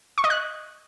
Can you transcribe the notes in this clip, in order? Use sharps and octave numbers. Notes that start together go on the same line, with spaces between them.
C#6
D#5
F#6